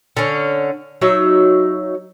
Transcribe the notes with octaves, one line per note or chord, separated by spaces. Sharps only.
D3 C#4
F#3 D#4 E5